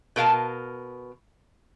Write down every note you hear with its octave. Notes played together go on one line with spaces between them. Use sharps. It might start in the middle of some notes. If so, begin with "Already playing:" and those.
B2 A#4 F5 A5